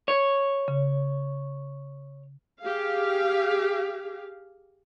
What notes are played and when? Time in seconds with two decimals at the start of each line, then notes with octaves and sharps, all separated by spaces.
0.08 C#5
0.68 C#3
2.63 G4 G#4 F5